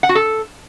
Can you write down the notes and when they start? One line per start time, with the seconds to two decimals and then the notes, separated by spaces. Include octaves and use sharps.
0.03 F#5
0.09 F#4
0.15 A4